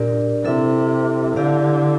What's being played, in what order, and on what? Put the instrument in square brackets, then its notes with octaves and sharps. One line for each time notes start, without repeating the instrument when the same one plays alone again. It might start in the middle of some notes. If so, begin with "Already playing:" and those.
Already playing: [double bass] A#2 [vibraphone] D4 G4 A#4 D5
[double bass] C3 [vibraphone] E4 A4 E5
[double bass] D3 [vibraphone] E4 G4 D5 F5